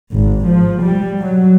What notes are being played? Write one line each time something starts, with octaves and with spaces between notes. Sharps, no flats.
G#1
F3
G3
F#3